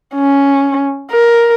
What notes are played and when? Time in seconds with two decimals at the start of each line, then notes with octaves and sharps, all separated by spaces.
0.15 C#4
1.12 A#4